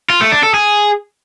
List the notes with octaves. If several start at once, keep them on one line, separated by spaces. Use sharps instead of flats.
F4
A3
D4
A4
G#4